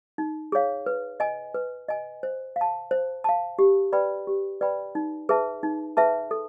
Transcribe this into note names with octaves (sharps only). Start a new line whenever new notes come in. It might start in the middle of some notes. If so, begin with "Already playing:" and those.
D#4
G#4 C#5 F5
B4
D#5 G#5
B4
D#5 G#5
C5
F5
A5
C5
F5 A5
G4
B4 D5 G5 B5
G4
B4 D5 G5 B5
D#4
G#4 B4 E5 A5
D#4
G#4 B4 E5 A5
A4